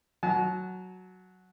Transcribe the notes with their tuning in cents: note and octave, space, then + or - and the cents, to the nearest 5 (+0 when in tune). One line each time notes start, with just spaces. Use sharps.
F#3 +0 A5 -40